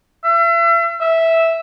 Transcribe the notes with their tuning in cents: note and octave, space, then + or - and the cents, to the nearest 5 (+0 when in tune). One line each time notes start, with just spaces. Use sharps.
E5 +40
E5 -5